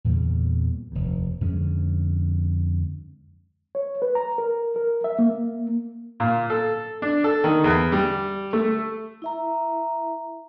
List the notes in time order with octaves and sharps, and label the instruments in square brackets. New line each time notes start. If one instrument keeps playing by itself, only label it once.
[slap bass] E2 A#2 C#3 G3
F1 D#2
F2 D3 G#3 C#4
[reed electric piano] C#5
B4
A#5
A#4
A#4
E5
A#3
[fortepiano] A#2
A4
D4
A4
D#3
E2
G3
A3
[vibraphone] E4 E5 A#5